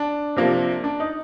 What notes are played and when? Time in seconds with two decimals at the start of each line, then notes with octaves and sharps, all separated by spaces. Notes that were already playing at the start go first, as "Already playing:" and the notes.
Already playing: D4
0.36 C3 F3 A#3
0.84 D4
1.00 D#4